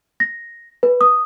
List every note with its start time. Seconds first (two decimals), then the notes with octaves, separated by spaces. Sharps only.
0.20 A#6
0.83 B4
1.01 D#6